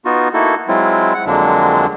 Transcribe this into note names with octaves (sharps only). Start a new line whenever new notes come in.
B3 D#4 F4 F#4
A#3 D#4 E4 F#4 A4
F#3 G#3 C4 E4 F4
F#5
F2 D3 F#3 G#3 A#3 D4